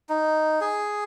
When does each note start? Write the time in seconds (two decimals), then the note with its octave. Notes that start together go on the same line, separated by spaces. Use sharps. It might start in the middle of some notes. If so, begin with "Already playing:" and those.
0.09 D#4
0.61 G#4